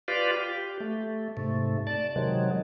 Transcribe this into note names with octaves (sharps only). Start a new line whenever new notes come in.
F4 G4 B4 D5 F5
G4
A3
G#2 C3 A3
D5 A5
C3 D#3 F#3 G#3